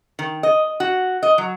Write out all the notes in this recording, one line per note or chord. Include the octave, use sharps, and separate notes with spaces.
D#3
D#5
F#4
D#5
F#3